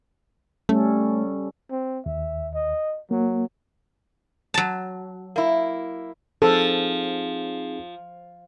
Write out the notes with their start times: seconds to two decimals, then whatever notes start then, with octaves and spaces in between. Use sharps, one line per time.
0.69 G3 A3 C#4 A4
1.71 C4
2.06 D#2 E5
2.54 D#5
3.11 F#3 A#3
4.54 F#3 A5
5.36 A#3 E4
6.42 F3 C4 D#4 G#4 A4